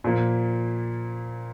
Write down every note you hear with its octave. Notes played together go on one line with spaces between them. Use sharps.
A#2 F3 A#3